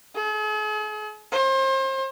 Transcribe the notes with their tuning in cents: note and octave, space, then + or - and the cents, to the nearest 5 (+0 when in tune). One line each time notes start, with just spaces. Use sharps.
G#4 +45
C5 +35